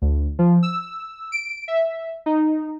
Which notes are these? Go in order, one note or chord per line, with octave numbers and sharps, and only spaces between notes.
D2
F3
E6
D7
E5
D#4